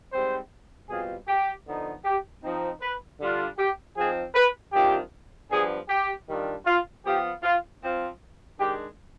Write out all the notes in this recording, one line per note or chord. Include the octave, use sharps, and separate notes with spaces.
G#2 G3 C4 C5
B2 G3 C4 F4 G#4
G4
D3 F3 B3 D#4
G4
F3 C4 D#4
B4
D3 G3 D4 F4
G4
F3 C4 D#4 G#4
B4
C3 D#3 G3 D4 F4 G4
G2 F3 B3 D4 G#4
G4
D#3 G3 D4 F4
F4
F3 B3 F4 G4
F4
F3 C4 F4
D#3 G#3 D4 G4